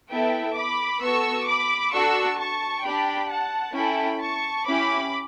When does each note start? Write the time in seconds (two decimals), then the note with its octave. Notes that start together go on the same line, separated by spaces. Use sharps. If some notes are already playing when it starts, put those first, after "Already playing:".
0.10 B3 E4 A4 E5 G5
0.56 B5 D6
1.01 B3 F#4 A4 C#6 E6
1.47 B5 D6
1.92 D4 F#4 A4 C#6 E6
2.39 A5 C#6
2.84 D4 G4 G5 B5
3.29 F#5 A5
3.75 C#4 E4 A4 G5 B5
4.21 A5 C#6
4.66 C#4 E4 G4 B5 D6